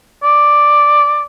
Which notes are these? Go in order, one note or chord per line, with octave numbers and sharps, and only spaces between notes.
D5